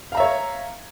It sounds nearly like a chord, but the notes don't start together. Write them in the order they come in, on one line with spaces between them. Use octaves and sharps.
F5 A#5 E5 C#5